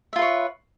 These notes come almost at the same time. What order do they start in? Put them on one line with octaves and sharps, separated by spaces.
E5 F4 B4 C#5